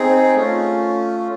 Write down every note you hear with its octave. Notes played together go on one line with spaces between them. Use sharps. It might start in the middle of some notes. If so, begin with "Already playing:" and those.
Already playing: C4 D#4 G#4
A3 C#4 F4